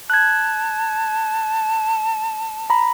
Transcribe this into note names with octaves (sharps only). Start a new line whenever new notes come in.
A5 F#6 G#6
A#5 B5